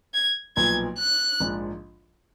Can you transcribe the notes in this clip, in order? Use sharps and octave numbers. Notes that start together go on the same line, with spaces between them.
G#6
B1 A#2 F3 B3 G#6
F#6
A#1 G#2 F3